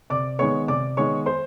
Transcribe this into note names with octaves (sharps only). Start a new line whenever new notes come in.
C3 D5 D6
D#3 G#3 B3 C#5 C#6
C3 D5 D6
D#3 G#3 B3 C#5 C#6
C5 C6